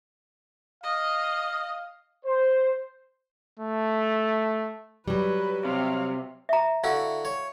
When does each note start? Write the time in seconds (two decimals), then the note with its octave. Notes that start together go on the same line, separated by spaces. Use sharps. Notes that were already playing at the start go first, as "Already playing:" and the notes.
0.83 D#5 F5
2.26 C5
3.59 A3
5.08 F#3 G3 B4
5.65 C3 C#5 F5
6.49 E5 A#5
6.84 D3 E4 F#4 F5
7.25 C#5